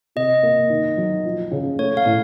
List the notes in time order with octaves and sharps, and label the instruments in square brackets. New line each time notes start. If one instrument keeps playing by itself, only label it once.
[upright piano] C3 [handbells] D#5
[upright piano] A#3
D#3
F#3
F3
C#3
[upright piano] A3 [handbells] C#5
[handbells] F5
[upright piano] A2